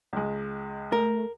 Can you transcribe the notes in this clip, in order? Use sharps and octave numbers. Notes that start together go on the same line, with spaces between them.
C#2 G#3
A3 A#4